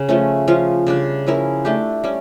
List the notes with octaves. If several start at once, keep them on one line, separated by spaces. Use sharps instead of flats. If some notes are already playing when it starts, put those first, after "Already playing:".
Already playing: C#3
F3 A3 C#4
F3 C#4 F4
C#3 G3 D4
F3 C#4 E4 A#4
A3 D4 G4
G3 C#4